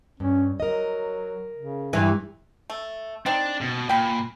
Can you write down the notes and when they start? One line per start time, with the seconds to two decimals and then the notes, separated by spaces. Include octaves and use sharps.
0.20 G2 C#4
0.60 F#3 A#4 D#5
1.57 C#3
1.93 G2 E3
2.70 A3
3.26 C4 D4 D#4
3.61 B2
3.89 A#2 G5 B5